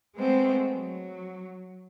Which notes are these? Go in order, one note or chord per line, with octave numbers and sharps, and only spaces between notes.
G#3 A3 B3 C4
F#3